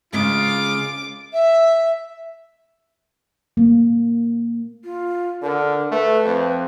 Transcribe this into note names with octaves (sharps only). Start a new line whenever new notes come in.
C#3 G#3 F4 D6
E5
A#3
F4
D3 A#4
A3 B4
F2